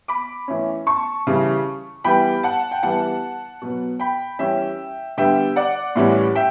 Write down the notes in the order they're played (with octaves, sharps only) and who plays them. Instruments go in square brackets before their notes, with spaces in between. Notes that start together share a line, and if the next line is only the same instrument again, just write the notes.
[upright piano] B5 D6
E3 A3 C#4
A5 C#6
C#3 E3 G3
E3 G3 B3 G5 B5
F#5 A5
G5
E3 G3 B3 F#5 A5
B2 F#3 B3
G5 B5
E3 G3 C#4 E5 G5
D3 G3 B3 E5 G5
D5 F#5
A2 E3 G3 C#4
E5 G5